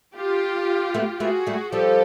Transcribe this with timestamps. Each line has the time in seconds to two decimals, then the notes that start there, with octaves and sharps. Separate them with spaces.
0.16 F4 G4
0.94 A3 B3
1.20 A3 B3 F#4 G#4
1.47 G3 A3
1.72 F3 G3 G4 A4